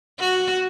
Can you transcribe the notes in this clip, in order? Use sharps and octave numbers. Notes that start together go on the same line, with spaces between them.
F#4